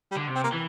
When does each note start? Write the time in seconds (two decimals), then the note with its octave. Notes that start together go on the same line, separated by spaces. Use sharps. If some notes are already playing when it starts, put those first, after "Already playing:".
0.11 G3
0.17 D3
0.27 C3
0.35 C4
0.44 A#3
0.53 E3